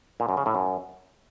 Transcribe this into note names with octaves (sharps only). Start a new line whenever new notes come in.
A#2
F#2
C#3
A2
F#2